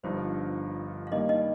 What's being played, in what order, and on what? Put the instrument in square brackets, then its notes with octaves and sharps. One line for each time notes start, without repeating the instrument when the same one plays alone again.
[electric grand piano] G1 G2 F3 D#4 [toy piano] C5
[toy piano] F5
[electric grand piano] D#3 G3 A#3 [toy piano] D#4 D#5
[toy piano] D#4 D#5